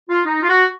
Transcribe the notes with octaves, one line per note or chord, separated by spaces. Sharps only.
F4
D#4
F4
F#4